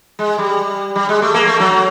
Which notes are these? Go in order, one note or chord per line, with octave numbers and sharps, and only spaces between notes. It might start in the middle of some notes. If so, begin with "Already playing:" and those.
G#3
G3
G3
G#3
A3
A#3
A3
F#3